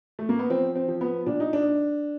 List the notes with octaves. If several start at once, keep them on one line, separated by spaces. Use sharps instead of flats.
A3
A#3
B3
F3 C4
C4
F3
B3
A#2 D4
D#4
D4